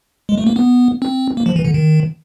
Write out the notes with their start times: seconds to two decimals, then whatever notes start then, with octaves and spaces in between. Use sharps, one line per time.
0.29 G#3
0.38 A3
0.46 A#3
0.56 B3
1.02 C4
1.37 A#3
1.46 F3
1.56 E3
1.65 D3
1.74 D#3